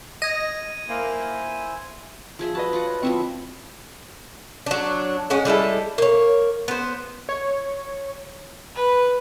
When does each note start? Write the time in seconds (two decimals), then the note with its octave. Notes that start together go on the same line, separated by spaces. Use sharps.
0.22 D#5 G#6 D#7
0.89 A#3 E4 C5 G#5
2.39 F3 G#4 E5
2.55 F#4 B4 D#5 A5
2.73 F4 F#5
2.86 C#5
3.03 F3 C4 E4 D#5 E5 C#6
4.66 F#3 D4
5.30 G#3 C#4 F#4
5.45 G3 G#3 E4 A4
5.98 A#3 C#5
6.68 B3 C5
7.29 C#5
8.75 B4